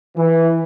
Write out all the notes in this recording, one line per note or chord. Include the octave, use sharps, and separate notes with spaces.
E3